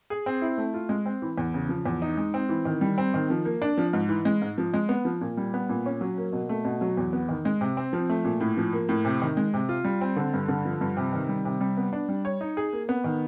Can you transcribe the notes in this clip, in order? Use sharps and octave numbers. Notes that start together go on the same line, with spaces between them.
G#4
C4
E4
A3
F4
G#3
C4
E3
E2
C#3
F3
E2
D#4
G#3
C4
E3
D#3
G3
C4
D#3
F3
A#3
D4
F3
G#2
E3
G#3
G#2
F3
G#3
B3
F3
A#2
G3
B3
A#2
C#4
F#3
A#3
B2
A3
B2
F#3
E2
B3
D#3
G#3
C3
C4
F3
A3
A#2
A2
F3
A#3
A2
C3
D#3
G#3
C3
F4
G3
C4
D3
G2
D3
F3
G2
C3
D#3
G3
C3
G3
B3
D4
G3
C#5
D#4
G#4
A#3
B3
D#3